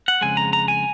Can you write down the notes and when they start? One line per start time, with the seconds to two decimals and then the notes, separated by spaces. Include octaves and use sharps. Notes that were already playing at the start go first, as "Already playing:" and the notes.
0.08 F#5
0.21 F2 C#3 G#3 G#5
0.37 A#5
0.53 A#5
0.68 G#5